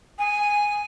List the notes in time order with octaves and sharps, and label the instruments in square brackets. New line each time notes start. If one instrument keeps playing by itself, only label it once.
[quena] G#5